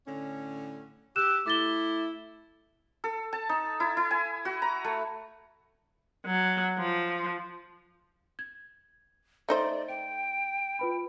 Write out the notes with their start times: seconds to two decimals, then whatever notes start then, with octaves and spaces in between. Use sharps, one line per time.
0.07 A2 D3 C#4
1.16 G4 E6 F#6 E7
1.46 A3 E4 D6 A6 G7
3.04 A4
3.33 A5
3.49 D#4
3.80 E4
3.97 E4
4.11 G#5
4.45 F#4
4.62 A#5
4.84 A3
6.26 F#3
6.79 F3
8.39 G#6
9.49 A3 D#4 C5 D5
9.89 G5 D7
10.79 F4 B4 B5